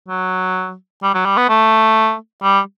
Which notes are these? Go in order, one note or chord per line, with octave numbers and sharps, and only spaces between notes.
F#3
G3
F#3
G3
B3
A3
G3